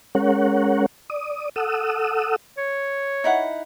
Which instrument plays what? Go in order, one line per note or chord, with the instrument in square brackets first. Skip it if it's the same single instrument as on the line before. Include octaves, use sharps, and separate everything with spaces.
[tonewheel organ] G#3 C#4 A#4 C#5 F#5
D5 D#6
A4 F#5 D#6 E6
[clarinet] C#5
[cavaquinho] D#4 E4 F#5